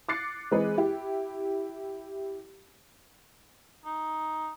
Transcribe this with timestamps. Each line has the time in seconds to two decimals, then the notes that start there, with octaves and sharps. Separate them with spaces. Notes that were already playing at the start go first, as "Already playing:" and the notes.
0.09 D6 F#6 A6 C7 C#7
0.51 E3 G#3 C4 G#4 B4
0.78 E4 G4
3.85 D#4